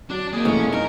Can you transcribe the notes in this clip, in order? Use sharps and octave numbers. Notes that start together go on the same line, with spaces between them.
F#3 D4 F#4
D#3 A#3 G#4
F1 B1 G#3 A3 C#4 E4 D#6
D#4 A#4